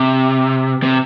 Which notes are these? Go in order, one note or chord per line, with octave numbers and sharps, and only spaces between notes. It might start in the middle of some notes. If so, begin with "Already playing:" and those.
Already playing: C3
C3